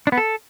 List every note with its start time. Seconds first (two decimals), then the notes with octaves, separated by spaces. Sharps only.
0.07 D4
0.12 B3
0.18 A4